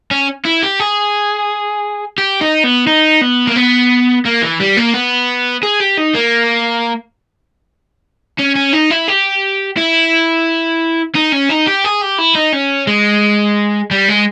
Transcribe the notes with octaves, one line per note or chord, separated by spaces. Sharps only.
C#4
E4
G4
G#4
G4
D#4
B3
D#4
B3
A#3
B3
A#3
E3
G3
A#3
B3
G#4
G4
D#4
A#3
C#4
C#4
D#4
E4
G4
E4
D#4
C#4
D#4
G4
G#4
G4
E4
D#4
C#4
G#3
G3
G#3